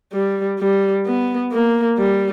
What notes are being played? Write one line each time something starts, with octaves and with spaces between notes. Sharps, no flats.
G3
G3
B3
A#3
G3